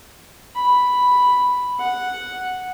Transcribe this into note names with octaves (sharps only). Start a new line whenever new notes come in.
B5
F#5